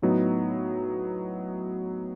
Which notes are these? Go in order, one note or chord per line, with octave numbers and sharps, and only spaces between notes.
A2 F#3 B3 D#4